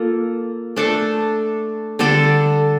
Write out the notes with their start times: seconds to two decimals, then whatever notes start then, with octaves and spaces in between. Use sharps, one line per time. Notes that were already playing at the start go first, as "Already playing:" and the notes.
Already playing: A#3 F4 A4
0.76 A3 D4 A4
1.99 D3 G3 D4 A4